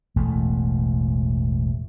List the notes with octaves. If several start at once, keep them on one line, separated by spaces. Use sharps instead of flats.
E1 A1 E2 A3